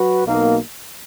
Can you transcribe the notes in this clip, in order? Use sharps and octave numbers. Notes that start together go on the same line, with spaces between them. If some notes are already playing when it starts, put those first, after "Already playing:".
Already playing: F#3 F#4 B4
B1 B2 A#3 D#4